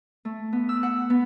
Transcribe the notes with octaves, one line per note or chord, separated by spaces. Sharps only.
A3
B3
E6
F#5
B3